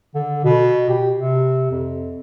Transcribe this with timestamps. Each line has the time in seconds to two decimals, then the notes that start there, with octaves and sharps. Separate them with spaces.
0.15 D3
0.44 B2
0.89 G4
1.17 C3
1.71 F2